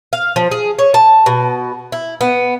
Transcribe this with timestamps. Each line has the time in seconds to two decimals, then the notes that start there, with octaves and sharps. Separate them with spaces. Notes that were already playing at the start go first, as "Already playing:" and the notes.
0.13 F5
0.36 F3
0.51 G#4
0.79 C#5
0.94 A5
1.26 B2
1.92 E4
2.21 B3